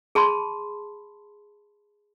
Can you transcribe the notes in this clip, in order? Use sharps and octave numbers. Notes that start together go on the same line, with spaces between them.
G#4 A5 B5 C6